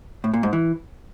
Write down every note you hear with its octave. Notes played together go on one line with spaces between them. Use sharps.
A2
A#2
G#2
E3